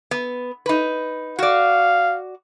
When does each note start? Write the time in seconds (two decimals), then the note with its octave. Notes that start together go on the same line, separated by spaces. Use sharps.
0.11 B3
0.66 D#4 B4
1.39 F#4 D5 F5